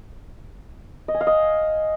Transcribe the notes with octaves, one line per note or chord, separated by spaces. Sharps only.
D#5
G#5
F5
D#5